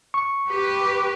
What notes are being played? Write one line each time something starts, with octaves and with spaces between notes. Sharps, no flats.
C#6
G4 B4